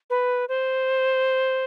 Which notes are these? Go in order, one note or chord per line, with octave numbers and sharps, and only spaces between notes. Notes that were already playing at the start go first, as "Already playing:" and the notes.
B4
C5